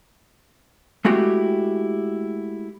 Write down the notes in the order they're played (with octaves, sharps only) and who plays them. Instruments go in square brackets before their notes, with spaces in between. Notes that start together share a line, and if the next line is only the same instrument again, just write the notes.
[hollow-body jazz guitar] G#3 A3 E4 F#4 G4